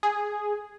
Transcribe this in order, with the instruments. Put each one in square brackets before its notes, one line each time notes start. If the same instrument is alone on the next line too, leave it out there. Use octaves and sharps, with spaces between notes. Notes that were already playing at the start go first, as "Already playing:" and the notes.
[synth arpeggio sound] G#4